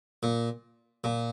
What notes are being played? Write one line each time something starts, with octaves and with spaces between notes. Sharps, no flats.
A#2
A#2